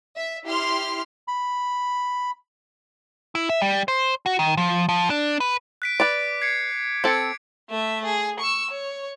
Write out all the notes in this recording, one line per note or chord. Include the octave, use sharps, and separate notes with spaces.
E5
E4 G4 C6 F6
B5
E4
E5
G3
C5
F#4
D#3
F3
F3
D4
B4
F#6 B6 D7
B4 D5 D6 D7
G#6 C7 C#7
C4 A4 G#6 C#7
A3 E5
G#4
C#6 E6
C#5